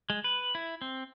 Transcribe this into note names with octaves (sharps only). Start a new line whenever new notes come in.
G#3
B4
E4
C4